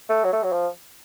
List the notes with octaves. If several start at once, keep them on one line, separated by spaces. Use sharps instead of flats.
A3
F#3
A3
F#3
F3